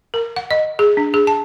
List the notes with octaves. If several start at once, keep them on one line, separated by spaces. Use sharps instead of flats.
A#4
F#5
D#5
G#4
D4
G#4
A5